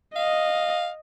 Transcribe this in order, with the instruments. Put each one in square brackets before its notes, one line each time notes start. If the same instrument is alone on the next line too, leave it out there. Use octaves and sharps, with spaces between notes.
[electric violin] D#5 [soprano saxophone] F5